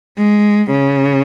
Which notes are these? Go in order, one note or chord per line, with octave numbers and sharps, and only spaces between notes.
G#3
C#3